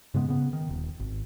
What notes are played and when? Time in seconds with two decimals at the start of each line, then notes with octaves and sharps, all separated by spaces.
0.14 G#2 C#3 G#3 B3
0.28 C#3 B3
0.53 D#3
0.69 D#1
0.99 G#1